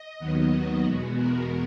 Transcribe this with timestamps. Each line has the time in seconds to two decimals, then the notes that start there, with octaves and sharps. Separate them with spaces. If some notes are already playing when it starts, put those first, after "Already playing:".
Already playing: D#5
0.19 D#2 D#3 F#3 B3
0.51 F#4
0.83 E2 B2 G#3 B3
1.16 A#4